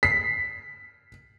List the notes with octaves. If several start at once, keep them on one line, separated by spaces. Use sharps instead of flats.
B6 C7